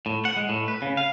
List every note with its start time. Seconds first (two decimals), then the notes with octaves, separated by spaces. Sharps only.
0.06 A2
0.25 F#5
0.37 G#3
0.49 A2
0.68 B4
0.82 C#3
0.97 F5